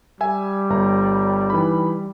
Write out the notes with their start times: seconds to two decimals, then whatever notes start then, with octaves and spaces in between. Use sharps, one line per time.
0.21 G3 E5 G#5
0.70 G1 A#5
1.50 E3 D#4 B5